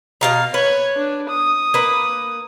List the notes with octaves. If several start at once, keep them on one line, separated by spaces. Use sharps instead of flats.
B2 F5 A#5
B4 C#5
D4
D#6
A#3 B4